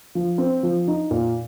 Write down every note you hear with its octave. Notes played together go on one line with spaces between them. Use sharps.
F3
C4
F3
D#4
A#2